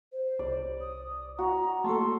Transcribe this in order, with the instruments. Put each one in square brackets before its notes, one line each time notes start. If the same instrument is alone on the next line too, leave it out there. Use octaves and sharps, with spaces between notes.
[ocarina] C5
[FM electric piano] C2 [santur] D5
[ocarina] D#6
[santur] F#4 [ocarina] A#5
[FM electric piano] A3 A#3 C#6 [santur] A4 A5 [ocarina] C6